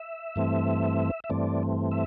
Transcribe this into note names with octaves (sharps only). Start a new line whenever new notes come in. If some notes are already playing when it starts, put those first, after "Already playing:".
Already playing: E5
G2 E3 A3 C4
E5
G2 E3 A3 C4 D5
E5